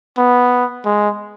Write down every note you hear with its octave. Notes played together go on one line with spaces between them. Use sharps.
B3
G#3